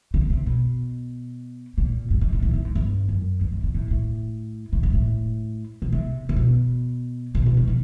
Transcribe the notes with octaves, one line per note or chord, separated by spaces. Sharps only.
C#3
C3
B2
A#2
G2
G#2
A2
A2
A2
G#2
G2
F#2
G2
G#2
G#2
A2
A2
A2
G#2
A2
B2
C3
C3
B2
A#2
B2
E3
D#3